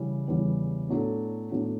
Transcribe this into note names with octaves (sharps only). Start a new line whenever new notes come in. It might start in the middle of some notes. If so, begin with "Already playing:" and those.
Already playing: C#3 E3 G3
E2 C#3 E3 G3
A2 F#3 B3 D4 A4
A2 F#3 B3 D4 A4